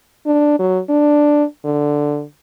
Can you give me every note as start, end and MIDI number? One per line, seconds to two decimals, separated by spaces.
0.26 0.58 62
0.59 0.79 54
0.89 1.44 62
1.65 2.23 50